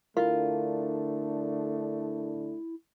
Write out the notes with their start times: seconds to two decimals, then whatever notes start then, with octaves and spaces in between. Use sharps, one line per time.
0.17 D3 A3 D4 E4 F4 A#4